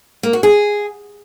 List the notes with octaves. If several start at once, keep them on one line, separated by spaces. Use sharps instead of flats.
A#3
F#4
G#4